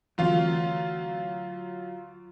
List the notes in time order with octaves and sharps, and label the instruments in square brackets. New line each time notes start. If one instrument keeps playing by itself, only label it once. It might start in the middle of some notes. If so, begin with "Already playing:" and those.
[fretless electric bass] D2 E3 C4 [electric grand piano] F#3 F4 F5